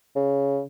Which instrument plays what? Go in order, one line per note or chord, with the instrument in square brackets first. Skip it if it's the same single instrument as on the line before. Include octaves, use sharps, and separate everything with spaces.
[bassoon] C#3